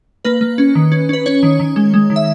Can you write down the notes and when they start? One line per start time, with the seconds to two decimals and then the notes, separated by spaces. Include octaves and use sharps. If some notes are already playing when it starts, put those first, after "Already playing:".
0.25 A#3 B4
0.41 A#3
0.58 C#4
0.75 D#3
0.92 C#4
1.09 C#4 B4
1.26 C#4 C#5
1.43 D#3
1.60 D#3
1.76 G#3
1.94 G#3
2.10 D#3
2.16 E5